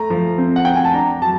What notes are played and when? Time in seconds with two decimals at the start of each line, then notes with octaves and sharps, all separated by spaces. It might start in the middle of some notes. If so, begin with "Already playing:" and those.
Already playing: A3 A#5
0.10 F3
0.38 C4
0.56 F#5
0.65 C4 G5
0.75 G#5
0.85 A5
0.94 D4 A#5
1.22 F#3 A5